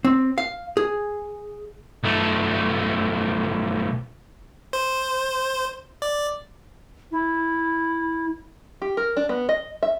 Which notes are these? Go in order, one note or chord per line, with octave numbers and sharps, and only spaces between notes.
C4
F5
G#4
B1 A3
C5
D5
E4
G4
A#4
D4
B3
D#5
E5